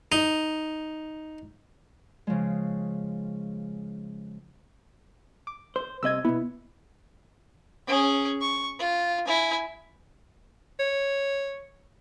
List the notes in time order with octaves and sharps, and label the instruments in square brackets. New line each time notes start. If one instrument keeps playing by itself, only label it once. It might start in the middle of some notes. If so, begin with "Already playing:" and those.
[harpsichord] D#4
[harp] C#3 F3 G#3
[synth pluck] D6
[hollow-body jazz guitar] C5
[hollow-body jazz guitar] C2 C3 D#5 [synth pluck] E6 G#6
[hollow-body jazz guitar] B2 B3 [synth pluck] E4
[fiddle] C#4 G#4
C#6
F4
E4 G#5
[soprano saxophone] C#5